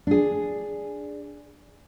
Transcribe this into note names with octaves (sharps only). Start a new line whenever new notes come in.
D4 G#4